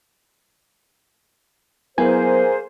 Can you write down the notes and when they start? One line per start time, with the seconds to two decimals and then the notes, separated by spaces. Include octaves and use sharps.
1.98 F#3 A#3 B3 E4 G#4 A#4 C5 G#5